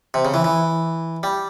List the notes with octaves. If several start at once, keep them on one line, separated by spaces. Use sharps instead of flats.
C3
C#3
E3
E3
G3